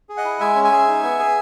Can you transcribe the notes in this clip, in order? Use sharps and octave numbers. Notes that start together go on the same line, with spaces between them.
G#4
D#5 F#5
E4
G#3 E5 G#5
C#4
E5 G#5
G#4
D#4
B3
G#4